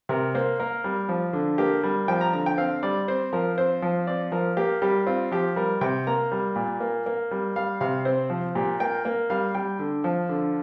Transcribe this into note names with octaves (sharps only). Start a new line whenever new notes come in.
C3 A#4
A#3 C5
A#3 A#4
G3
F3
D3
A#3 G4
G3
F3 G5
A#5
D3 A#5
G5
C4 F5
G3 D5
C4 C5
F3 A#4
C4 C5
F3
C4 D5
F3 A#4
A#3 G4
G3 G4
C4 F4
F3 G4
G3 A#4
C3 G5
A#3 A#5
G3
A#2
A#3
A#3
G3
G3 F5
C3 F5
C4 C5
F3
A#2 G4
A#3 G5
A#3
G3 F5
G3 G5
D3
F3
D3